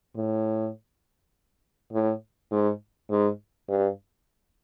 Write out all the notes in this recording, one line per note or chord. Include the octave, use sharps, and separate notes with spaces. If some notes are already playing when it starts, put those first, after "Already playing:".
A2
A2
G#2
G#2
G2